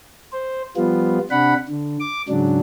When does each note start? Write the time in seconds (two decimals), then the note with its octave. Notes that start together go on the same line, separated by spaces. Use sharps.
0.33 C5
0.77 F3 G3 B3 F4
1.31 C3 D4 F#5 B5
1.69 D3
2.00 D6
2.29 G#2 C#3 F#3 D4